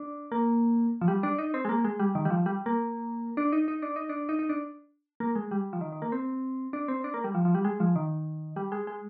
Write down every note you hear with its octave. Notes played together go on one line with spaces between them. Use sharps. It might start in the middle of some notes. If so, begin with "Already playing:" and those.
Already playing: D4
A#3
F3
G3
D4
D#4
C4
G#3
A#3
G#3
G3
D#3
G3
F3
G3
A#3
D4
D#4
D#4
D4
D#4
D4
D#4
D#4
D4
A#3
G#3
G3
F3
D#3
D#3
A#3
C4
D4
C4
D4
A#3
G3
F3
F3
G3
G#3
F3
D#3
G3
G#3
G#3